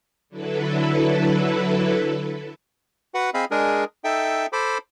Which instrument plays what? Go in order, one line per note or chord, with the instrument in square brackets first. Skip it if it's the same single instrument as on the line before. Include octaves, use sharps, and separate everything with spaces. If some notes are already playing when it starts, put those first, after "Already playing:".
[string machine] D3 F#3 E4 A4 B4
[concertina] F#4 B4 F#5
C4 G#4 D#5 F5 B5
G#3 D4 G#4 A#4
D#4 A4 E5 G5
A4 C5 B5 D6